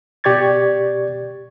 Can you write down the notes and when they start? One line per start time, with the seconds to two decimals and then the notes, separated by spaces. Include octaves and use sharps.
0.24 B2 G4 D5 C#6 G#6 A6